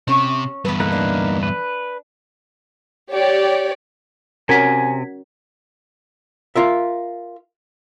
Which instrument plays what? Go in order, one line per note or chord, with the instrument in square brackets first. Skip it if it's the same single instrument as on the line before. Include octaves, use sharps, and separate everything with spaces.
[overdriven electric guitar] C3 [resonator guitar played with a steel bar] C#4 C#5
[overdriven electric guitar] E2 G2 [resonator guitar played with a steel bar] B3 B4
[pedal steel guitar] A#3 D#4 B4 [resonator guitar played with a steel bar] A4
[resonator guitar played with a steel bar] D4
[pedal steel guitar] B4
[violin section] G4 C#5 D5
[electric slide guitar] C3 [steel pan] C#4 F#4 A#4 [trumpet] G#5 [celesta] G#6 B6
[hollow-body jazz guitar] F4 A#4 E5